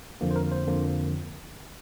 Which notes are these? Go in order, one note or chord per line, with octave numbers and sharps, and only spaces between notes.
F2 D3 F3 A#3
C5
A#4
C5
F2 D3 F3 A#3